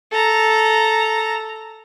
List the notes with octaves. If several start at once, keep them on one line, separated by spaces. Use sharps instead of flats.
A4 A#5